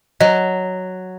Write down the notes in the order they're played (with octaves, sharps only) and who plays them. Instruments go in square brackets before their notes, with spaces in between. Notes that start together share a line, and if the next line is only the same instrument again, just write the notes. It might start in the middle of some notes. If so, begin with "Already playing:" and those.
[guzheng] F#3 [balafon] D#5